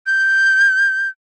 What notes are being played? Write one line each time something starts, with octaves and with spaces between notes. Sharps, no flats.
G6